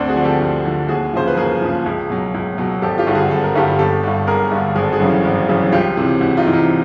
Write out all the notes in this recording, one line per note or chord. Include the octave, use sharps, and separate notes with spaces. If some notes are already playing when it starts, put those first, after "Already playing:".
Already playing: D2 C4 D4
F#4 G#4
D3 F3
G4 A4
D2
D3 F3
D#2 F#4 G#4
C#3 F3 C5
B4
D#2 G#4 A#4
C#3 F3
C#2
B2 F#3
C#2
B2 F#3
G#1 G4 A4
F4 G4
G2 D3 G3
F#4 G#4
G#1 A4
A#4
G2 D3 G3 G4 A4
G1 G4 A4
G2 D3
G1 G#4 A#4
G2 D3
G#1 G#4
A4
F#4 G#4
F#2 C#3 E3 G3
G#1
F#2 C#3 E3 G3
C#2 F4 G4
C3 E3
C#2 E4 F#4
D#4 F4
C3 E3 E4
D#4 F4